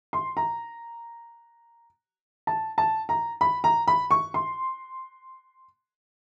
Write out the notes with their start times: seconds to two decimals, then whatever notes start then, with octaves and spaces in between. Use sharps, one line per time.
0.13 C6
0.37 A#5
2.47 A5
2.78 A5
3.09 A#5
3.41 B5
3.64 A#5
3.88 B5
4.11 C#6
4.34 C6